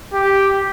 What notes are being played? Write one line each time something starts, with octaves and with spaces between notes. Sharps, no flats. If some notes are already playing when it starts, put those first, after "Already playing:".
G4